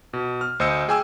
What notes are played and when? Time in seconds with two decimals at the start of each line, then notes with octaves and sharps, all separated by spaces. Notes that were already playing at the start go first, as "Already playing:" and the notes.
0.13 B2
0.41 F6
0.60 D2 C5 D#5 D#6 E6 C#7
0.89 G#4 G5 G#5 D6 E6